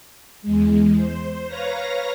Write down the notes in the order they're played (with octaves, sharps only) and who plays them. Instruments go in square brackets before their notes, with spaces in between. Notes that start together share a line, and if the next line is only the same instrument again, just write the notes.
[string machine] E2 G#3
C5
B4 C#5 F5 A#5 A#6